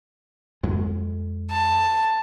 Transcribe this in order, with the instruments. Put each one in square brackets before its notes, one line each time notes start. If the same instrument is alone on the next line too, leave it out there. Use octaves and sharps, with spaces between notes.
[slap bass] F2 G#3
[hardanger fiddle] A5